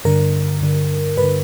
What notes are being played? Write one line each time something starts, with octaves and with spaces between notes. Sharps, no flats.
G2 D3 A#4
G2 D3
G2 D3 B4